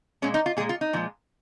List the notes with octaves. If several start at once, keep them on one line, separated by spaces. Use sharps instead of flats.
A#2 G#3 C#4
D#4
F4
A#2 G#3 G#4
F4
D#4
A#2 F3 G#3